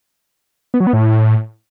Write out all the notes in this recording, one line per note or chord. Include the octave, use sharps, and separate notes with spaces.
B3
F#3
B3
A2